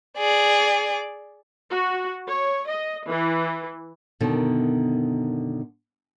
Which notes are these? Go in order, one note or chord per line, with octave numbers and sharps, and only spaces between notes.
G#4 D5
F#4
C#5
D#5
E3
F#2 B2 D3 D#3